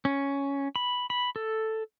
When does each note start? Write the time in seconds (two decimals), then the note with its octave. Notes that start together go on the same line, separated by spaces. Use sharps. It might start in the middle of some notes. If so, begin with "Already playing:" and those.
0.05 C#4
0.76 B5
1.10 B5
1.36 A4